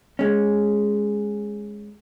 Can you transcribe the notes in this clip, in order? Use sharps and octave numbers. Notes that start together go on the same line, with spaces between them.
G#3 C#4